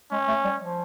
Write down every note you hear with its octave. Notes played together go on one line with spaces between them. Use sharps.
G#3 C#4
A3
G3
F3